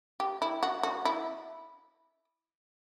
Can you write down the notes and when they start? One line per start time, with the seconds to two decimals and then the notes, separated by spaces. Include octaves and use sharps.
0.20 G4
0.42 E4
0.63 F#4
0.83 F#4
1.05 E4